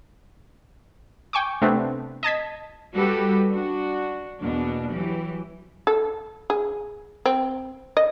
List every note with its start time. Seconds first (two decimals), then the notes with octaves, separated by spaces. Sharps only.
1.33 G5 G#5 C#6 D6
1.61 C3 A3 B3 C4 D4
2.23 D#5 A5 G#6 B6
2.93 G3 F#4 G4 A4 B4
3.51 D4 F#4
4.40 E2 B2 A#3 D4
4.92 E3 F#3 G4
5.87 A4
6.50 G#4
7.26 C4
7.97 D#5